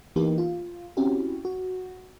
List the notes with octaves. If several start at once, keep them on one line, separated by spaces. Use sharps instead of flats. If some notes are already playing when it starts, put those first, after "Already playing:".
E3 A#3 B3 D#4 G4
F4
C4 C#4 E4 F#4 G4
F#4